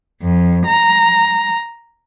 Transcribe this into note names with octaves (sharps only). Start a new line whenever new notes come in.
F2
A#5